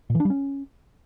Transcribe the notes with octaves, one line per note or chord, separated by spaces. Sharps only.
A#2
E3
D4
G3
C#4